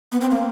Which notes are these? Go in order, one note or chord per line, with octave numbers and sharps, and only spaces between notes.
B3
C4
A#3